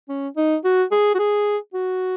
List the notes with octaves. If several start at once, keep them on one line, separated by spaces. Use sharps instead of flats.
C#4
D#4
F#4
G#4
F#4
G#4
F#4